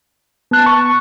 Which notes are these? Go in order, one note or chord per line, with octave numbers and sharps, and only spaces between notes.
B3 A5 F#6
C#6